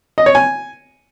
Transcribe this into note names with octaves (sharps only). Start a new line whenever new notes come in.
D#5
C#5
G#5